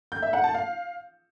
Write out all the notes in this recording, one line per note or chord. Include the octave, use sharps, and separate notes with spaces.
G6
E5
F#5
A5
F5